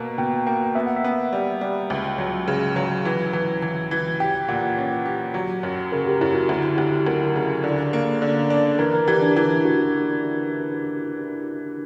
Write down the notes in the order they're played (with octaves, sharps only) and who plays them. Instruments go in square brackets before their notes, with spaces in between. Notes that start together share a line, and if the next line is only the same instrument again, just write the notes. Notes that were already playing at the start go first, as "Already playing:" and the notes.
Already playing: [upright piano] B2 A#3 [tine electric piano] A#5
[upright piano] B2 [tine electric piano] G5
[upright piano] A#3 [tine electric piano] G5
[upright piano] B3 [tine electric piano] E5
[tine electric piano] F#5
E5
[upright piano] B3
G3
G3
C#2
F#3
C#3
F#3
E3
E3
E3
E3
[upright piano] G4 [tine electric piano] G5
[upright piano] A#2 [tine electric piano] F#5
[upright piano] C#4
G4
F#3
F#2
[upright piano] C#3 [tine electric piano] A#4
[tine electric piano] G4
[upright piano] F#2 [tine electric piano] E4
[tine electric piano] F#4
[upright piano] D2 [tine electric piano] E4
[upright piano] D2 [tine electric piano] G4
[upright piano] D2 [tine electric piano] A#4
[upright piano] C#3
D3
A#3
D3
D4
[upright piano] E3 [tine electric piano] A#4
[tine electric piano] A#4
[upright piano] E3 [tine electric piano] G4
[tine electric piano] D4
[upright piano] E3 [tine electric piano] E4
[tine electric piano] F#4